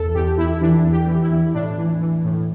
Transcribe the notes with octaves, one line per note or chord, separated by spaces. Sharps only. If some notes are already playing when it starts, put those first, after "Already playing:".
Already playing: E2 E3 A4
E2 G4
E2 E4
E3 D4
E2
G4
E3
E4
E2
A2 D4
E3
E3
A2